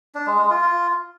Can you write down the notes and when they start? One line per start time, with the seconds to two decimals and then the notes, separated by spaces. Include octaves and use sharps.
0.15 D4
0.27 G#3
0.38 G#3
0.50 F4
0.62 F4